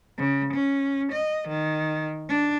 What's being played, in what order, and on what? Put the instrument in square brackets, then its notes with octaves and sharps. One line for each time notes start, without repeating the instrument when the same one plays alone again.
[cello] C#3
C#4
D#5
D#3
D4